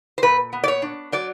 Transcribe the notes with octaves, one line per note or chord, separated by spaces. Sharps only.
C5
A#2 B4
B3
D5
C#5
D4
F#3 D5